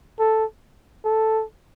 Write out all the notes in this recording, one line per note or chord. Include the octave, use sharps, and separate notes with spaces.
A4
A4